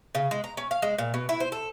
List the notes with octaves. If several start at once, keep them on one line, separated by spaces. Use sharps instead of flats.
C#3
G#3
A#5
C#4
F5
G#3
A#2
B2
E4
C5
A4